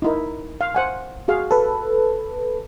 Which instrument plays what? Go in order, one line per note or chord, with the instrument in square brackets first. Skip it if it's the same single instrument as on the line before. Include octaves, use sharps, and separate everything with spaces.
[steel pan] D#4 E4 A#4
F5
C5 F#5 G#5
F#4 G#4 F5
[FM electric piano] A4 B4